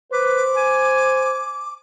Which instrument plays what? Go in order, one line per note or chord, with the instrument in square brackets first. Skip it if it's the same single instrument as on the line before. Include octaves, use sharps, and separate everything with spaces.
[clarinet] B4 [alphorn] C5 [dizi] D6
[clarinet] G#5